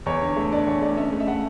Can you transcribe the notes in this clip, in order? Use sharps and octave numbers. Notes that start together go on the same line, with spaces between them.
E2 C#5
D3
A3
D4 D5
E2 C#5
A3 D5
C#4 E5
A3
E5
A3 F#5